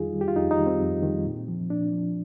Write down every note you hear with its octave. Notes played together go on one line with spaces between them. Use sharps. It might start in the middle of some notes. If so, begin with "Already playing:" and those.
Already playing: F2 D#3 G3 D#4 F4 G#4
D#3 G3
G4
F4
F2 D#4
D#4
D#3 G3
C4
F2
D#3 G3
A#2
F3
A#2 D4
F3